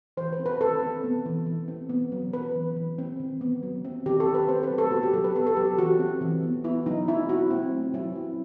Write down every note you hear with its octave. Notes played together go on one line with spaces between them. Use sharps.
E3 C5
B4
C4
B4
D#3 A4
C4
B3
E3
E3
C4
B3
F#3
B3 B4
E3
E3
C4
D#3
B3
F#3
C4
D#3 G4
A4
C4
B4
C4 C5
B4
F#3
A4
B3 F#4
G4
F#3 A4
B4
B3 A4
A4
F#3 G4
E3 F#4
C4
E3
B3
B3 E4
F#3 D#4
C4 E4
F#3 F#4
C4
A3
F#3 E4
C4